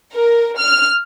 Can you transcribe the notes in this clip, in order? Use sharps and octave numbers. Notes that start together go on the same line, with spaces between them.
A#4
F6